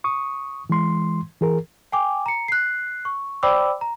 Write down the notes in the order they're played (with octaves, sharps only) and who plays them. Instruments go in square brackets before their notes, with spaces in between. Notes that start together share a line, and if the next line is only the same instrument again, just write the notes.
[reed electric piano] C#6 D#6
E3 G#3 C6
E3 G#4 A#4
[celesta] G5 G#5 D6
A#5 C#7
F#6 C7
C#6
C5 D5 G5 B5 D6 E6
A#5